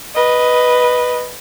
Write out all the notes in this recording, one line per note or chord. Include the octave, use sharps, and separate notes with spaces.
B4 D#5